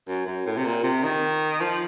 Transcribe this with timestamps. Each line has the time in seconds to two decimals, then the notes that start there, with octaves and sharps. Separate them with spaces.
0.08 F#2
0.27 F#2
0.46 A2
0.57 C3
0.66 A#2
0.84 C3
1.04 D#3
1.61 F3